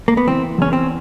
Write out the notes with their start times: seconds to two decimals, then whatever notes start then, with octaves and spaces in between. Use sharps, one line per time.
0.08 A#3
0.17 B3
0.27 E3 C4
0.58 E2 C#4
0.73 C4